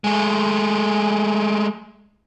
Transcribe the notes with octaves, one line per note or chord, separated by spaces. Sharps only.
G#3 A3